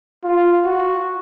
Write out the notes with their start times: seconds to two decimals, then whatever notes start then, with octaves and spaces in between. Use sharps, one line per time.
0.24 F4
0.65 F#4